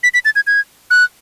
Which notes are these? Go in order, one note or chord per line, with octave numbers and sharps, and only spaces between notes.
B6
B6
A6
G#6
G#6
F#6